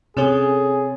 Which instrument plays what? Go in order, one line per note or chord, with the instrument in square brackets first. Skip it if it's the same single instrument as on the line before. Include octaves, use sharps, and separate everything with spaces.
[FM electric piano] C3 C#4 [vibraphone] C4 A4 C#5 [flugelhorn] G#4